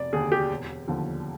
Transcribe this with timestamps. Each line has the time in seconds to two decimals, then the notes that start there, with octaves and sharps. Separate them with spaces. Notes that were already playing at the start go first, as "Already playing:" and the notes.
Already playing: F1 D5
0.13 D#2 D3 G#4
0.32 G4
0.50 E1
0.88 D#2 D3 F3